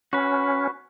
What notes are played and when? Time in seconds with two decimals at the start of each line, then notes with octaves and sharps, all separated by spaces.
0.13 C#4 F#4 B4